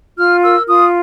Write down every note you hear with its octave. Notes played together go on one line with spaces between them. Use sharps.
F4 F6
A#4 E6
F4 D#6